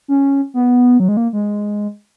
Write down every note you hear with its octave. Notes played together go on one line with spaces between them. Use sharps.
C#4
B3
F#3
G#3
A#3
G#3